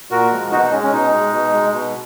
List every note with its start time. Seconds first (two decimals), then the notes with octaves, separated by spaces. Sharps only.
0.11 A#2 F#4 A#4
0.31 F3 G#3
0.51 B2 D#4 F#4
0.62 D#4
0.72 G#3 C#4
0.83 C#4
0.92 B2 D#4
1.12 G#3
1.33 B2
1.53 G#3
1.73 B2